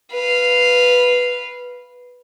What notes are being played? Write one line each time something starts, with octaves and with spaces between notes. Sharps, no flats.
B4 F5